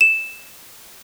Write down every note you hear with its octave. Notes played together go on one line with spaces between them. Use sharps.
E7